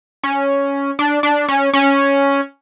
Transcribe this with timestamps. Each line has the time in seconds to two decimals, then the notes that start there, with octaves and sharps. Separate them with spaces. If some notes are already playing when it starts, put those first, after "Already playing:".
0.23 C#4
0.99 D4
1.23 D4
1.48 C#4
1.73 C#4